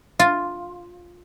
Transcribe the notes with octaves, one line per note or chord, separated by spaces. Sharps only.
F4